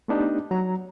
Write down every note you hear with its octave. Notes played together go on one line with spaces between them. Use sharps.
A3 B3 D4 D#4 G4
F#3 A#5